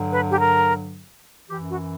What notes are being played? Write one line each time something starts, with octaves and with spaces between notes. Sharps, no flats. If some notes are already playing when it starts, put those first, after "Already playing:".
Already playing: G2 D3 F#3
B4
G4
A#4
F#2 E3 G4
F#4